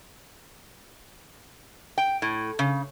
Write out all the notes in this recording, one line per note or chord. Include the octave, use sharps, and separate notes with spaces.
G5
A2
C#3